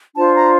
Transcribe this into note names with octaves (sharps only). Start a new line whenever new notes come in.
D4 F4 C5 A5
A#5